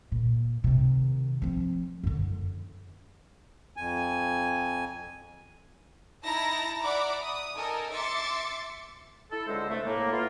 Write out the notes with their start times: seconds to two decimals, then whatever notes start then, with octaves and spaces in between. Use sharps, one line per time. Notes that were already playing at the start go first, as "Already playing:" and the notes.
0.12 A#2
0.64 C3 D#3
1.42 F3 C4
2.03 F#2 D3
3.77 F2 G#5
6.24 D#4 E4 A5 A#5 A#6
6.83 D5 E5 F#5 A#5 B5 D6
7.22 D#6
7.56 D#4 A4 A#4 G#5
7.93 E5 C6 D6 A6 C#7
9.31 E4 A4
9.47 C#2 D3 G#3 C5 E6
9.69 C3 A3
9.85 A2 A#3
10.12 B3 E4 F4